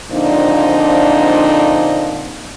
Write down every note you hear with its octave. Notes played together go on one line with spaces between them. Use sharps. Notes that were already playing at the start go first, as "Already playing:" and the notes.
A#2 D3 F3 C4 D4 D#4